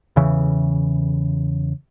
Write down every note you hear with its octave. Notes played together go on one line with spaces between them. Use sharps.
E2 C#3 E3